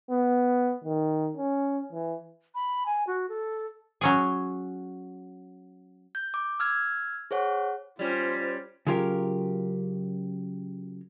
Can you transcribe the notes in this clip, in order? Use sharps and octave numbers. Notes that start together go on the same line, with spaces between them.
B3
D#3
C#4
E3
B5
G#5
F#4
A4
F#3 C#4 G#4
G6
D6
E6 F6 G#6
G#4 C5 C#5 F#5
G3 C#4 F4 C5
C#3 F#3 F4 G4 A#4